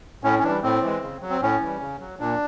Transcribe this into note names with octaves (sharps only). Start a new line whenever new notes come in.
A2 C#4
C#4
E3 D4
G3
A2 C4
E3 G#3
C#3
F#3
C4
A2 C#4
E3 G3
C#3
F#3
A#2 D4